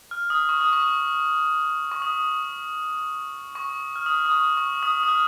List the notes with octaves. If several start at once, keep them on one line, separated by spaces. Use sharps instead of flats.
F6
D#6
C#6
D#6
C#6
C#6
D#6
C#6
F6
D#6
D#6
C#6
C#6
D#6
D#6
F6